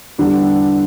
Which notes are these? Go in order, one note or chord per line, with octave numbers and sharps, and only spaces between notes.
E2 D3 G3 D4 G4